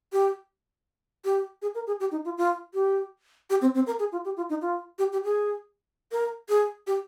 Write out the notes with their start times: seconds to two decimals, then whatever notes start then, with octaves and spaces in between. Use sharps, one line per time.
0.13 G4
1.25 G4
1.62 G#4
1.75 A#4
1.87 G#4
2.00 G4
2.11 D#4
2.25 F4
2.37 F4
2.74 G4
3.50 G4
3.61 C4
3.75 C4
3.87 A#4
3.99 G#4
4.12 F4
4.25 G4
4.37 F4
4.50 D#4
4.62 F4
4.99 G4
5.12 G4
5.24 G#4
6.12 A#4
6.49 G#4
6.87 G4